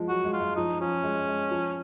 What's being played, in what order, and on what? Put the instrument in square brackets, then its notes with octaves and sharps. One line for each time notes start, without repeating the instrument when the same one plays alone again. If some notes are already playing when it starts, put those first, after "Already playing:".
Already playing: [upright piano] F3 G#3
[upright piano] F#3 [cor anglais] F#4
[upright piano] G#3
[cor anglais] F4
[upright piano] G#3
[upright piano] F3 [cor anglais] D#4
[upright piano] F3 [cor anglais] C#4
[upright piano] G#3
G#3
F3